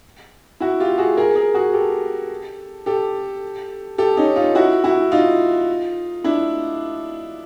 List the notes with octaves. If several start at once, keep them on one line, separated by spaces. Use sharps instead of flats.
E4 F#4
F4 G4
F#4 G#4
G#4 A#4
G#4 A#4
F#4 G#4
G4 A4
G4 A4
G4 A4
C#4 D#4
D#4 F4
E4 F#4
E4 F#4
D#4 F4
D4 E4